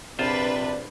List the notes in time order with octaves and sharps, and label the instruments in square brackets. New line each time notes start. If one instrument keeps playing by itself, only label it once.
[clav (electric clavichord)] A#1 F4 C5 [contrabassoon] C3 [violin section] D4 B4 [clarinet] D5